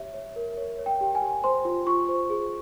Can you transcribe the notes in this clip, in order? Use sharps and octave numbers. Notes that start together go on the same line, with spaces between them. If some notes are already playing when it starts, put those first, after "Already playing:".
Already playing: G4 C#5 E5
C#5
A#4
C#5
C#5
G5
G4
G#5
G4
C5 C6
F4
F4 C#6
C5
G#4